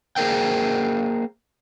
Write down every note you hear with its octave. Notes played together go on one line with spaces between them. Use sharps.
A#3 G#4 A#4 C5 G5